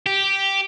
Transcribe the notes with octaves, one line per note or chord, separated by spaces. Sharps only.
G4